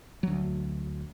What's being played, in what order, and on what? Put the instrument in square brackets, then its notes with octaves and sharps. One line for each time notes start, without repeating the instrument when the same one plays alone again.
[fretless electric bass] D2 F#3